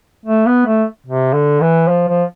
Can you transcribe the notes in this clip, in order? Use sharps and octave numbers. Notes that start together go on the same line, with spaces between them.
A3
B3
A3
C3
D3
E3
F3
F3